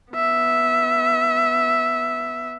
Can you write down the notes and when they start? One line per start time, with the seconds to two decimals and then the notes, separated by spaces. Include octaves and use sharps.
0.13 B3 E5